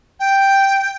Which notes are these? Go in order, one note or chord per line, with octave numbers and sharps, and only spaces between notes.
G5